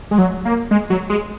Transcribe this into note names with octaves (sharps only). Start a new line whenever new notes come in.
G#3
F#3
A#3
G#3
F#3
G#3